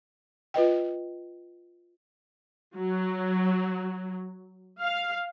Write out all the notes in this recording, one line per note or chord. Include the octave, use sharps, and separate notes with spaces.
F4 B4 D#5 G5
F#3
F5